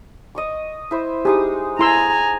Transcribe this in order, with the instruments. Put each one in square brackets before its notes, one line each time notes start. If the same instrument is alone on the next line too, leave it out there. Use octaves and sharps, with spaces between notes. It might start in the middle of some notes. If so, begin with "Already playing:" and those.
[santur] D#5 C#6 D6
E4 C5
[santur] G#3 D#4 D#6 [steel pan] G4
[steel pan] E4 C6 E6 [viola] G#5 A#5 [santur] D#6